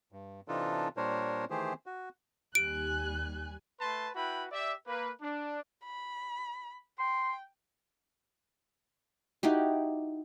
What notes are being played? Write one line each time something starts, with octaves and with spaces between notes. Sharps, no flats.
G2
C3 E3 D4 D#4 F4 A4
A#2 G3 D4 A#4 C5 C#5
D#3 E3 A3 G4 G#4 C5
F#4
D#2 G3 G#5 F#6 D7
A3 B4 A5 C6
E4 F#4 B4 G5 B5
G4 D5 E5
A#3 B4
D4
B5
G5 C6
D#4 E4 F#4 G4